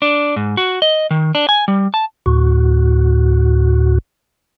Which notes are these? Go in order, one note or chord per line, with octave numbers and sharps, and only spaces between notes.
D4
G#2
F#4
D#5
D#3
D4
G#5
G3
A5
D2 A2 F#4